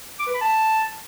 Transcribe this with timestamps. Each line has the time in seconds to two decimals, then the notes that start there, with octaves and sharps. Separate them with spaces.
0.19 D6
0.27 B4
0.34 B5
0.41 A5